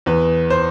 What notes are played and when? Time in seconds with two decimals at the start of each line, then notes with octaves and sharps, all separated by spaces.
0.06 E2 B4
0.50 C5